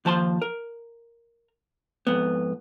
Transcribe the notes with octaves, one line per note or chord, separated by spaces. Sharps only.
D#2 F3 C5 A5 A#5 C6
A#4
F2 G#2 B3